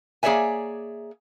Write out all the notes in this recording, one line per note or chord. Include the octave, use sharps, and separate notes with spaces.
A#3 G#4 C#5 D5 E5 G#5